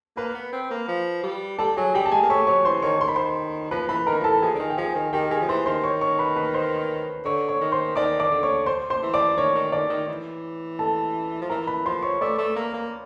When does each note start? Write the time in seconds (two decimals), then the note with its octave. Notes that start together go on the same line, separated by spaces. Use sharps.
0.17 A#3 B4 B5
0.35 B3
0.53 C4
0.71 A#3
0.88 F3
1.24 G3
1.59 G3 A4 A5
1.77 F#3 G#4 G#5
1.94 G3 G4 G5
2.06 A5
2.12 G#3 G#4 G#5
2.23 A#3
2.30 A3 C#5 C#6
2.47 F#3 C#5 C#6
2.65 E3 C5 C6
2.82 D#3 C#5 C#6
3.01 D#3 C6
3.08 B5
3.16 C5 C6
3.71 F3 B4 B5
3.89 E3 B4 B5
4.07 D#3 A#4 A#5
4.21 F3
4.24 E3 A4 A5
4.42 F3 G#4 G#5
4.55 D3
4.59 D#3
4.70 G5
4.78 F3 G#4 G#5
4.95 D#3
5.13 D#3 G4 G5
5.31 D#3 G#4 G#5
5.42 F3
5.48 E3 C5 C6
5.66 D#3 C5 C6
5.84 C#5 C#6
6.01 C#5 C#6
6.19 B4 B5
6.36 B4 B5
6.54 C5 C6
7.25 D3 C#5 C#6
7.49 C#5 C#6
7.61 D#3
7.72 C5 C6
7.95 D#3 D5 D6
8.20 D5 D6
8.31 D3
8.43 C#5 C#6
8.66 C5 C6
8.90 C5 C6
9.02 E3
9.14 D5 D6
9.37 D#3 C#5 C#6
9.55 D#3
9.72 D#3 D5 D6
9.90 D#3
10.09 E3
10.79 A4 A5
11.42 F3
11.50 E3 A#4 A#5
11.67 B4 B5
11.86 F3 C5 C6
12.03 C#5 C#6
12.21 A3 D5 D6
12.38 A3
12.56 A#3
12.74 A#3